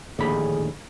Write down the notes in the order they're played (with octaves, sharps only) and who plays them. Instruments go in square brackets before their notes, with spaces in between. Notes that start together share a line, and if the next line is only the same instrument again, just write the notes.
[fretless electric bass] A#1 A2 D3 [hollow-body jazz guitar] D#2 B5 [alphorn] G#4